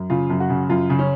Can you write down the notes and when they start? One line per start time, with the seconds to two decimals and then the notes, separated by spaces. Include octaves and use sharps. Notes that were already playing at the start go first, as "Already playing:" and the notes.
Already playing: F#2
0.10 C#3 F4
0.30 F#2
0.40 F#4
0.50 C#3
0.69 F#2 F4
0.90 C#3
0.99 C#4